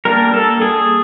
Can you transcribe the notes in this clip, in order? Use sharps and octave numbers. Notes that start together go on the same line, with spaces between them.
G3 A#3 D4 A#4
A4
G#4